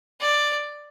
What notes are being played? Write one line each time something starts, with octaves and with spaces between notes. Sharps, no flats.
D5